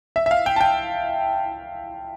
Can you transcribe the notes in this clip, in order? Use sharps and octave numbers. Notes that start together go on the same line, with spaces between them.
E5
E5
F5
G5
A5
G5